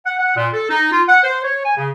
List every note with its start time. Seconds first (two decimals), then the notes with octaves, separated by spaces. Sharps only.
0.06 F#5
0.19 F#5
0.37 A#2
0.54 A4
0.70 D#4
0.92 F4
1.09 F#5
1.24 C5
1.44 C#5
1.65 G#5
1.77 C#3